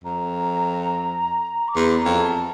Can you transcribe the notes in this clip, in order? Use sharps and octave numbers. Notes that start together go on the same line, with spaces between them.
F2 A#5
D6
E2 C6
A#5
F2
A5